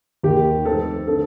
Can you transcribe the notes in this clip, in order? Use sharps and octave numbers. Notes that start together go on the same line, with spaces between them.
D#2 D#3 A#3 G4
F2 D#3 A3 C4 A4
D3 A3 C4 A4